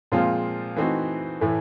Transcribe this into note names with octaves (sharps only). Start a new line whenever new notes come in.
A#2 F3 G#3 C4 F4
E3 A3 C4 D#4 F#4
A2 E3 A3